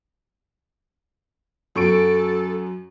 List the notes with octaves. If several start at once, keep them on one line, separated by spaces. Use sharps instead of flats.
F#2 A4 C#6 D7